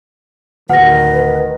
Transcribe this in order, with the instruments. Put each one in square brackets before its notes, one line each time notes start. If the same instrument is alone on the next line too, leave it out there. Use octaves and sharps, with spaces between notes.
[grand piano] D1 F6 [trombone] D#3 [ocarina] B4 [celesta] F#5 A#6